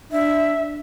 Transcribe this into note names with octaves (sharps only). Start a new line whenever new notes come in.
D4 E5